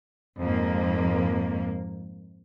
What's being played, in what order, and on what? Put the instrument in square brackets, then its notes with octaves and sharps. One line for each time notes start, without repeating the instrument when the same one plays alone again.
[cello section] F2 G#2 A#3